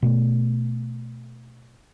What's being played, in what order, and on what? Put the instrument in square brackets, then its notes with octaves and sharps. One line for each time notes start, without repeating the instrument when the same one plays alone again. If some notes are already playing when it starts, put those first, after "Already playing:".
[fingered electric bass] B2 A3